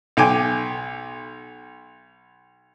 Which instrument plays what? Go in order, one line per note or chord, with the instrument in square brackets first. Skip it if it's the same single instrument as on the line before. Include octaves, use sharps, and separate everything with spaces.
[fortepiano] B1 G5 G#5 D6